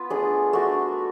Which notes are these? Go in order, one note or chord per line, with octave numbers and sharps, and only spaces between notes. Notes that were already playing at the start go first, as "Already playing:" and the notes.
Already playing: B3 F4 B4
A3 D4 G#4
A3 D4 F#4